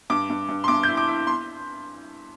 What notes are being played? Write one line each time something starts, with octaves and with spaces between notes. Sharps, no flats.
G2 D6
G2
G2
C6
G2 D6
E4 G6
D6
E4
C6